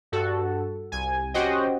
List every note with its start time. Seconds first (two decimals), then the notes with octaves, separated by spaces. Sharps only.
0.12 G2 F#4 A4
0.92 C2 G#5
1.34 C#4 F#4 G4 C5 D#5 G5